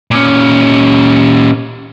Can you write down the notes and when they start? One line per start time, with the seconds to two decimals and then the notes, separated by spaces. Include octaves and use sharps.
0.11 A#2 C#4